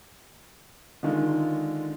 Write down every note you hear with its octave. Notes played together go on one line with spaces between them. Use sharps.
D3 D#3 G#3 F4